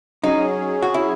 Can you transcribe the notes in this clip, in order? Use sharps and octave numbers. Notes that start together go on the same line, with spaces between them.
F#3 C#4 D#4 G#4
F#4
E4